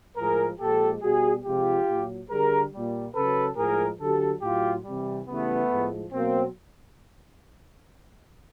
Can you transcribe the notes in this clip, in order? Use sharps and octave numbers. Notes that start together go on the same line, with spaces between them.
A2 F3 G#3 G#4 A#4
A#2 F3 G#3 G4 A4
B2 G3 F#4 G#4
C3 F3 G#3 F4 G4
A#2 F#3
D3 G3 G#4 A#4
A#2 G3
C#3 F#3 A4 B4
A2 F3 G#3 G#4 A#4
D3 F#3 G4 A4
A2 F#3 F4 G4
C3 E3 G3
C#3 E3 G3 A3 B3
A2 F3 G#3
B2 F#3 A#3 C4